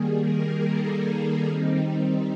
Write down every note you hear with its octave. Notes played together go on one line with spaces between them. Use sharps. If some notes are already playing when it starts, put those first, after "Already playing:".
Already playing: D#3 G3 A#3 G#4
A#4
A4
G#4
D#3 G3 C4 D#4